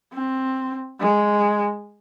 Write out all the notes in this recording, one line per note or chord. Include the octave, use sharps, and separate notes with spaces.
C4
G#3